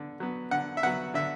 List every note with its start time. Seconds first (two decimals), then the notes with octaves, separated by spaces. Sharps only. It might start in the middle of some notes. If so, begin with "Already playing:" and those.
Already playing: D3 B3
0.20 F#3 B3
0.51 D3 F#5
0.77 E5
0.83 F#3 B3 F#5
1.14 D3 E5